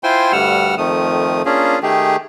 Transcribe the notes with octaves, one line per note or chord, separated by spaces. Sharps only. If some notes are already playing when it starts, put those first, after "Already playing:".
E4 F4 C5 G5 G#5 C6
D2 G2 G3 F#5 E6 F6
F2 D#3 F3 A3 D#6
A#3 C#4 D4 F4 G#4
D#3 A3 G4 G#4